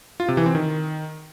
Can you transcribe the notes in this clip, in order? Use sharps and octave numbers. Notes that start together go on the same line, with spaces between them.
F4
C3
E3
C4
D#3